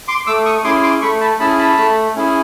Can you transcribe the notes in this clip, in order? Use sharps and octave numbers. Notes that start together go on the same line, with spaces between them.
C6 D6
A3 D6 E6
C#6 D#6
C#4 E4 G#4 C6 D6
C6 D6
A3 B5 C#6
A5 B5
C#4 E4 G#4 A5 B5
A5 B5
A3
C#4 E4 G#4